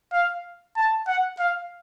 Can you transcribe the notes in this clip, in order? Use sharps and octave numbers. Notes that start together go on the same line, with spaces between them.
F5
A5
F#5
F5